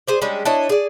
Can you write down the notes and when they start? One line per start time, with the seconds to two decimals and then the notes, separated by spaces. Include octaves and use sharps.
0.08 G#4 C5 D5
0.22 G3 G#3 C#4 D4
0.45 D4 E4 C#5 D#5
0.69 G#4 D5